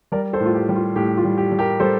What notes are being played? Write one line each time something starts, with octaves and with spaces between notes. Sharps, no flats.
G3 A#4 D5
A4 C5
A2
F4
G4
G3
F4
A2 G4
F4
G3
G4
G3
G4 A#4
G3 A4 C5